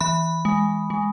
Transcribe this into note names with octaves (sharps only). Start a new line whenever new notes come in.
E3 B5
G#3
G#3